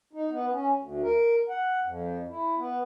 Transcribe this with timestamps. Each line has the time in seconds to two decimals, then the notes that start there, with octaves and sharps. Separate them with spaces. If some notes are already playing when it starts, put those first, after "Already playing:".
0.13 D#4
0.30 B3
0.52 C#4
0.78 D2
1.03 A#4
1.49 F#5
1.84 F2
2.29 E4
2.58 B3